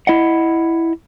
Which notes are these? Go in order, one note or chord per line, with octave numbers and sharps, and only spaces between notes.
E4 D#5 F#5